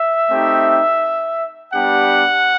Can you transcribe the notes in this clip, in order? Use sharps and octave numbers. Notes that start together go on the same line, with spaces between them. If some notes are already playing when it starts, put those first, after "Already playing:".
Already playing: E5
A3 C4 D#4 G4
G3 B3 D4 G4 F#5